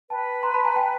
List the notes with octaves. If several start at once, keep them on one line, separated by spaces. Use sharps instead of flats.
B4 G5 A5
A#5 C6
A5 B5
G#5 A#5
G5 A5